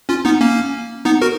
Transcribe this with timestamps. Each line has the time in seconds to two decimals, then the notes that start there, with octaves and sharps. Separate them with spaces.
0.09 C#4 F4
0.25 B3 D#4
0.41 A#3 C#4
1.05 B3 D#4
1.22 F#4 A#4